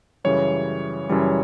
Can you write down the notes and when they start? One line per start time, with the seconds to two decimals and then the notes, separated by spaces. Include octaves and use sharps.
0.24 F#2 C#3 E3 G3 C#5
1.09 F#2 C#3 E3 G3